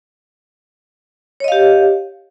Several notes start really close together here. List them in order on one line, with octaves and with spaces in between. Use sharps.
C#5 D#5 F5 G4